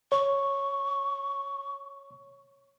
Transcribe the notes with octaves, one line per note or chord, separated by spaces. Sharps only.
C#5 C#6